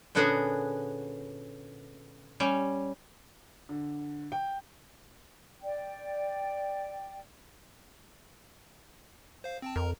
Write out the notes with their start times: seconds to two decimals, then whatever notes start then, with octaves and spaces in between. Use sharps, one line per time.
0.15 A#2 D3 B3 C#4 F#4 G#4
2.40 G3 C#4
3.69 D3
4.32 G5
5.62 D5 G5
9.44 C5 F5
9.62 C4 G5 A5
9.76 F2 A#4 A#5